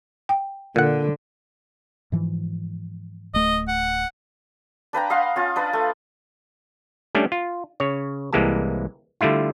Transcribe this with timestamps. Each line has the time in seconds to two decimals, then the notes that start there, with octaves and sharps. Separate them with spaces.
0.29 G5
0.76 A#2 D3 F#5
2.12 G#2 E3 F3
3.34 D1 A3 D#5
3.68 F#5
4.93 D4 B4 G5 A#5
5.10 D#5 F5 F#5 C6
5.36 C#4 F4
5.56 D4 B4 D#5
5.73 A3
7.15 G3 A3 C#4 D4
7.32 F4
7.80 C#3 C#5
8.33 C2 E3 G#3 A#3 G4 A5
9.21 D3 G3 A3 E4 F4